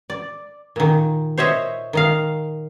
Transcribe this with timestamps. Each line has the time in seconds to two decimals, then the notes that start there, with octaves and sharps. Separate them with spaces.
0.10 D5
0.76 A#2 D#3
1.38 C5 C#5 D#5 E5
1.93 D#3 D#5 F5